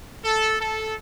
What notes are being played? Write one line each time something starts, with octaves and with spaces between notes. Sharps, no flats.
A4
A4